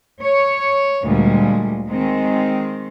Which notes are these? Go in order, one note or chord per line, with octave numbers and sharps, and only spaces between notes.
C#5
D2 A#2 G3 G#3
D#3 G#3 C4